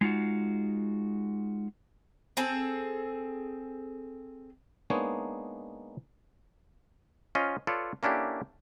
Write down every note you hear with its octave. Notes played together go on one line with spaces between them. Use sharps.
G#3 D#4 F4 F#4
C4 G#4 A4
G#3 A#3 B3 D4 D#4 C#5
C#4 F4 C5 D#5
F4 A4 B4 C#5 D5
A#3 C#4 D4 E4 G4 A4